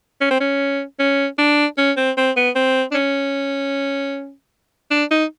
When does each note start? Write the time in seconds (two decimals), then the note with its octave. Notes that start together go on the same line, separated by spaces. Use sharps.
0.21 C#4
0.31 C4
0.40 C#4
1.00 C#4
1.39 D4
1.78 C#4
1.97 C4
2.18 C4
2.37 B3
2.56 C4
2.91 D4
2.95 C#4
4.91 D4
5.11 D#4